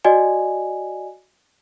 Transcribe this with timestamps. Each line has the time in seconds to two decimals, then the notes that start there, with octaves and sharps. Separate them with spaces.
0.05 F#4 D5 D#5 G#5